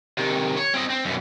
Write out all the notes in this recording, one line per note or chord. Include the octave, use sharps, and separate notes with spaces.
C3 D#3
C#5
C4 D#5
C4
F#2 B2